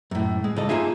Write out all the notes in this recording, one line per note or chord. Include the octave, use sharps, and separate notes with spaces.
F#2 A2
G#3
C#2 G#2 A4 D#5
A#3 B3 D#4 F4 G#4 E5